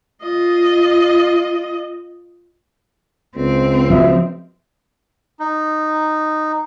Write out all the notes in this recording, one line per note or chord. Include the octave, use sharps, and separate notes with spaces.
F4 D#5
C#2 C4
F3 F#4 D#5 E5
D#4